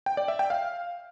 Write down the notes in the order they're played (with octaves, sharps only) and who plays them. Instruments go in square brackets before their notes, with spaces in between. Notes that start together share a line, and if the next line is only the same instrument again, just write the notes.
[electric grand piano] G5
D5
E5
G5
F5